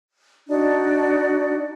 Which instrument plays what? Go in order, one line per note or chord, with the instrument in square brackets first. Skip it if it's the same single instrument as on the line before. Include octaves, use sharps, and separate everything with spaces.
[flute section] D4 D#4 F#4 D5